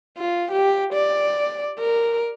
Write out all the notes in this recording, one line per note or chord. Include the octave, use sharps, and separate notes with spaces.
F4
G4
D5
A#4